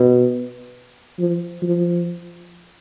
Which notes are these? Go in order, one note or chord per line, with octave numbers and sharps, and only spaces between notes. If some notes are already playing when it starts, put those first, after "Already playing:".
Already playing: B2
F3
F3